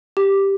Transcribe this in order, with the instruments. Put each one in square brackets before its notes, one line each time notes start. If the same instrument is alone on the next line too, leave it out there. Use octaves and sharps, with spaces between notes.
[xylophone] G4